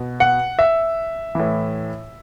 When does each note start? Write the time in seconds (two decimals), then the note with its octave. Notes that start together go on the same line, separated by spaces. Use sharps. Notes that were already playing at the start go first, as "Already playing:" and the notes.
Already playing: B2
0.20 F#5
0.59 E5
1.35 A2 E3